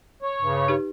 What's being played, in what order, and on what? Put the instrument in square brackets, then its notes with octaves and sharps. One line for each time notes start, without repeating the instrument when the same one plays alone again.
[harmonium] C#5
[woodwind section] G2 C#3
[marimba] D#4 G4 B4